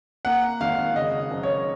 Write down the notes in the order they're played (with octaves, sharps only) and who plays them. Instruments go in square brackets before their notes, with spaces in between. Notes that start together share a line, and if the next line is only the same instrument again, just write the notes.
[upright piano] A#3 F#5
G#1 F5
C#3 D#5
F#1
C#5